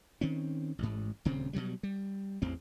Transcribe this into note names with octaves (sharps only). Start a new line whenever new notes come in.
D#3 C4 C#4
A1 G#2
D#1 D2 C#3 C4
B2 D3 F#3 G3
G3
A1 E2 C4